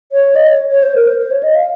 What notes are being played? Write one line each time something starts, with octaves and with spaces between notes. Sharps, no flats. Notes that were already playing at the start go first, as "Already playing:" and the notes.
C#5
D#5
C#5
C#5
C5
A#4
C5
C5
C#5
D#5
F5